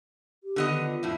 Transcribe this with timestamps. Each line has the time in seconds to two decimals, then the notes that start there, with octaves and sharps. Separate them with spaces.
0.44 G4
0.56 D3 B3 D#5
0.68 D#3
0.85 F4
1.03 F2 A2 E4